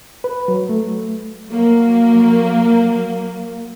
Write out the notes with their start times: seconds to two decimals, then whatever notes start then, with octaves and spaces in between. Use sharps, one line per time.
0.24 B4
0.48 F#3
0.69 A3
1.48 F#3 A#3